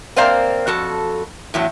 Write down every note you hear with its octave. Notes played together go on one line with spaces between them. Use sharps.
A#3 C4 C5 D5 F5 A#5
F2 F#4 A4
E2 A2 F#3